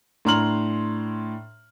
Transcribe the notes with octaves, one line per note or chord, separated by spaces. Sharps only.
A2 D4 A#5 C6 F6 F#7